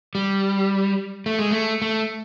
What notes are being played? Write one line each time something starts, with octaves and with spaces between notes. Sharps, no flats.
G3
A3
G#3
A3
A3